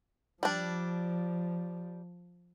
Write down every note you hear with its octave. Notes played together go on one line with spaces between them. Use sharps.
F3 G3 D4